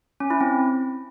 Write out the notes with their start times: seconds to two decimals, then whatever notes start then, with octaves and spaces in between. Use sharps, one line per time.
0.20 C#4
0.30 E4
0.41 C4